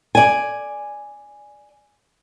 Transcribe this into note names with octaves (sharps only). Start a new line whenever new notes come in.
D5 G#5